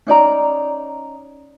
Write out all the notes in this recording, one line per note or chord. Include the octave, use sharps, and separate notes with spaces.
C#4 D#4 D5 A#5